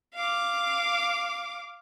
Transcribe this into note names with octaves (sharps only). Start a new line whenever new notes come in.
F5 D6